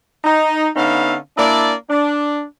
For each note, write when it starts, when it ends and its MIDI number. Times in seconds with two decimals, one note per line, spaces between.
0.24 0.68 63
0.75 1.16 50
0.75 1.16 59
0.75 1.16 61
0.75 1.16 63
0.75 1.16 76
0.75 1.16 77
1.37 1.73 58
1.37 1.73 62
1.37 1.73 64
1.37 1.73 74
1.89 2.43 62